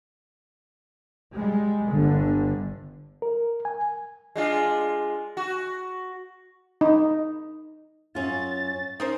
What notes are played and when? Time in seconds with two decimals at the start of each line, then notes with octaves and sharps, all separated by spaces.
1.33 G3 G#3
1.89 G1 D3
3.22 A#4
3.65 G#5
4.36 G#3 D4 F4
5.37 F#4
6.81 D#4
8.15 F#2 C#4 F4 A6
9.00 C#4 D#4 A#4 C5